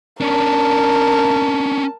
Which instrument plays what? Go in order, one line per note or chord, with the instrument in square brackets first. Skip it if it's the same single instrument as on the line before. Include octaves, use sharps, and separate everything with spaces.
[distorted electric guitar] C#4 D4 [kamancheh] A#4 A5